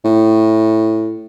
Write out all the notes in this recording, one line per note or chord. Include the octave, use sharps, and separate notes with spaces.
A2